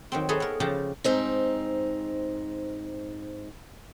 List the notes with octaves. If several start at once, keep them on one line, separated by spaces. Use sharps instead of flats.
D#3 F#3 C4
G#4 A4 B4 C#5 D#5 E5
B3 A#4
C#3 F3 G4 A5 A#5
G#2 C4 D#4